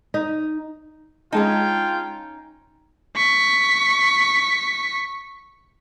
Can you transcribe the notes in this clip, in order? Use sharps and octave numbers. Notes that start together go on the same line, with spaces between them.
D#4
G#3 C#4 D#4 F4 G5 A5
C#6 B6